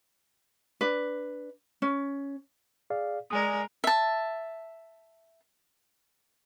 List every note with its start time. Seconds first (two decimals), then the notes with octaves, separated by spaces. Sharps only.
0.81 D4 B4
1.82 C#4
2.90 G#4 D5 F5
3.31 G#3 A#4 D5 G#5 D#6
3.84 E5 A5